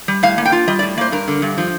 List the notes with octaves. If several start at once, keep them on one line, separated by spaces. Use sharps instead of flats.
G3
A2 F5
A#3
G5
F4
G3 D#5
D5
A2
A#3 C5
G2 A#4
D3
G2
F3